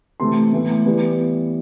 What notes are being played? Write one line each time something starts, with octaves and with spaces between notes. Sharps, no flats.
C3 E3 A3 C4 C6
A2 E3 B3
E3 G3 B3